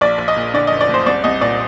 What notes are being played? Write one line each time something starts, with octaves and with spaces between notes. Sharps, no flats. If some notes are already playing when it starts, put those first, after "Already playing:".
A#1 D5
A#1
D#5
A#2
D3 D5
F#1 D#5
D5
F#1 C5
C2 D5
C2 D#5
A#2 D5